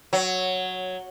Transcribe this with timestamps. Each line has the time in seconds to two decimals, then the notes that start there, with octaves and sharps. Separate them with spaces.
0.13 F#3